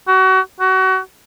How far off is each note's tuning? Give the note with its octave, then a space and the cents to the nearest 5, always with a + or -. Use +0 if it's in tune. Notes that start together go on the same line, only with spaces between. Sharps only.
F#4 +30
F#4 +30